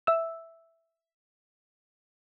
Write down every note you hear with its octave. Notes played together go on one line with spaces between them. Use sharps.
E5 E6